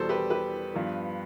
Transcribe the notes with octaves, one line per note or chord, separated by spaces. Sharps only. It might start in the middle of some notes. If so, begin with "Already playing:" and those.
Already playing: E2 B2 G3 A4 C5
G4 B4
G4 B4
G2 F3 B3